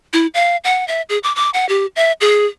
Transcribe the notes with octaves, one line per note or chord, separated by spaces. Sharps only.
E4
F5
F#5
E5
G#4
D6
D6
F#5
G4
E5
G#4